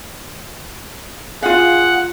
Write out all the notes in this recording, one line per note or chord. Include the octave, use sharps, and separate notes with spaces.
F4 G#4 F5 F#5